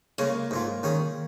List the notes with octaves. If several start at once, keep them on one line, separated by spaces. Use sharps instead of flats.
C#3 G#3 A#3 C#4
G#2 G#3 F4
D#3 C#4 G#4